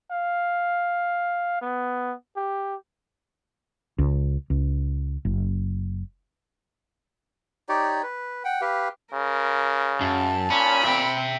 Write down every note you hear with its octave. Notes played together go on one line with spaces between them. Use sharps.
F5
B3
G4
C#2
C#2
F#1
D#4 G4 C#5 D5
B4
F#5 G5
G4 B4 F5
C#3 A#4
F#2 A5
A#2 C#4 B5
C4 E5 G5